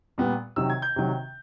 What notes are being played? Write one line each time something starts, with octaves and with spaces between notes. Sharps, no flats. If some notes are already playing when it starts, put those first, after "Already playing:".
A#2 G3 B3
C3 D#3 F#3 E6
G#6
G6
C3 D#3 F#3